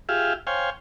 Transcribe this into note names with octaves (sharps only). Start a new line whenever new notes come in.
F4 G4 G#4 E5 F5
C5 C#5 F5 G5 G#5